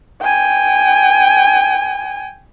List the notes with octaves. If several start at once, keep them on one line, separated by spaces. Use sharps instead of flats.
G5 G#5